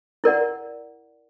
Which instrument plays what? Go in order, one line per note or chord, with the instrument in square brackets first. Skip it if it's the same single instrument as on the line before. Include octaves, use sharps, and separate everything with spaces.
[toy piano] E4 A#4 D5 F#5